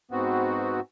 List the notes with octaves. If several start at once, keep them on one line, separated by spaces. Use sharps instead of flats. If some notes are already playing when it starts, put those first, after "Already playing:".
G#2 B3 C4 F#4